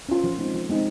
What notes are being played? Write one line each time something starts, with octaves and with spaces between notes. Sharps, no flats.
C#4 F4
F3
G#3 C4 D#4
F3
G#3 C4 D#4